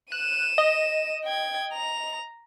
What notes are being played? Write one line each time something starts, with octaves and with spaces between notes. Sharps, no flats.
F#6 D#7 E7
D#5
G5 G#6
A#5 F7